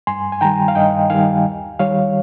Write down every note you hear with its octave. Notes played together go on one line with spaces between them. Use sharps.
G2 G#5 C6
G#5
D#3 G3 G5 A#5
F5
G2 D#5 G5
D#3 G3 F5 G#5
D#2
D#3 G3 C#5 F5